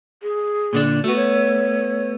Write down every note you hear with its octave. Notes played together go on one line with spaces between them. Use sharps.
G#4
A#2 D3 D4
A3 B3 F#4
C#5